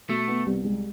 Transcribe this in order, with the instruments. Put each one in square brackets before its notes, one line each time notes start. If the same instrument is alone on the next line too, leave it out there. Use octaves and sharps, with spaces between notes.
[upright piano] B2 [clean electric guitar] A3
[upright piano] B3
C2
G#3